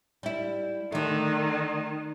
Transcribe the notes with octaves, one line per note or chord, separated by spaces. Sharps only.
G3 E4
D3 D#3 A3